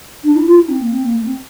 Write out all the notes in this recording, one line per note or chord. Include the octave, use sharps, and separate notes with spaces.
D4
E4
F4
E4
C4
A#3
C4
A#3
A3
C4